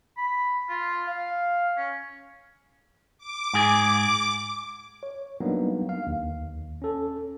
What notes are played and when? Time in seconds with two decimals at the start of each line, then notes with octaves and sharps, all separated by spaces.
0.17 B5
0.69 F4
1.07 F5
1.77 C#4
3.19 D6
3.54 G#2 G#4
5.03 C#5
5.40 F#3 G3 A#3 B3 D4 D#4
5.89 F5
6.07 D#2
6.82 C#4 A4